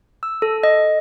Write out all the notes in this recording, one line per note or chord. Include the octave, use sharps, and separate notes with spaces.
E6
A4
D#5